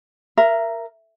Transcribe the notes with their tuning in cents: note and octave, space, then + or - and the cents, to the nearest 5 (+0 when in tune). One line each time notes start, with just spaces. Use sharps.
A#4 +0 E5 +30